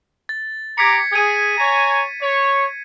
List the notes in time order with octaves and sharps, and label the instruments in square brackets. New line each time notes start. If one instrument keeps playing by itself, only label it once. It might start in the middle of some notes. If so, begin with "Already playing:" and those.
[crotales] A6
[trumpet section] G4 A#5 D6 [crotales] G#6 B6 C#7
[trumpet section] G#4 [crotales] G#6 D#7
[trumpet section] C#5 G#5 A#5
C#5